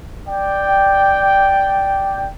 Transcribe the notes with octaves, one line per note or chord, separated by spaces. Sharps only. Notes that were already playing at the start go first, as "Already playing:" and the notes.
D5 G5